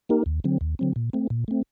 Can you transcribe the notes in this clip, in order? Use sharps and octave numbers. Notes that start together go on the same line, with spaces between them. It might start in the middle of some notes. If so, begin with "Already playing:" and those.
A#3 D#4 G4 A#4
D#2
D3 F#3 C4
D#2
D3 F#3 C4
A#2
A3 C4
A#2
A3 C4